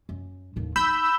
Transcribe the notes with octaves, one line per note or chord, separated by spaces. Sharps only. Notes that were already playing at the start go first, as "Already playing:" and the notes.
F#2
D#2 A2
D#4 B5 E6 G6